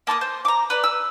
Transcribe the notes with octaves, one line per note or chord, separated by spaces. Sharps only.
A#3 A5 C6 D#6
C5
A#5 D6
B4 D5
E6